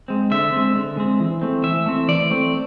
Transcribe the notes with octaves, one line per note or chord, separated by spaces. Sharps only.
G#3 C4
D3 E5
G#3 C4
D3
G#3 C4
E3
A3 C4
E3 E5
A3 C4
E3 D5
A3 C4